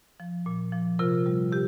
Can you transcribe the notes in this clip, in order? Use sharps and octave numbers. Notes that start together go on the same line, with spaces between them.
F3
A#2
F3
C3 F4 A#4
G3
C3 G4